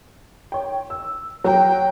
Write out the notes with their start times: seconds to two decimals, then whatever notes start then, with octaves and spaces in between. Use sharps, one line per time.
0.52 C#5 G5
0.90 E6
1.44 F#3 G5